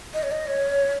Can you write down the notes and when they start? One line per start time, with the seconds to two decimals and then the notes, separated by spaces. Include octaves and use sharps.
0.14 D#5
0.23 C#5
0.32 D#5
0.47 C#5